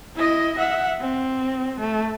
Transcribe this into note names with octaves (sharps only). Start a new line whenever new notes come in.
E4 D#5
E5 F#5
C4
A3